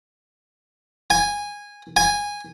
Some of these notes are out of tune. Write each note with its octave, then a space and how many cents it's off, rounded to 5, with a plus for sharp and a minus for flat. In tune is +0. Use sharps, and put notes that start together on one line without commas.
G#5 -15
G#5 -15